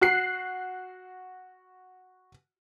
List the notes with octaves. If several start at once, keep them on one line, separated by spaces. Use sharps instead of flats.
F#4 F#6 C7